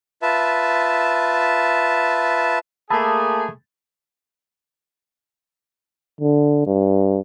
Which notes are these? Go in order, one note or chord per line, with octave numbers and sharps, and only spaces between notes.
F4 B4 E5 A5
A3 A#3 G#4 A5 B5 E6
D3
G2